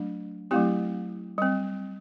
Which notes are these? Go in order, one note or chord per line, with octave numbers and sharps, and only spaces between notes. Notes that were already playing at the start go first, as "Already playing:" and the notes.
Already playing: F#3 A3 D4
F#3 A3 C4 E4 G4
G3 C4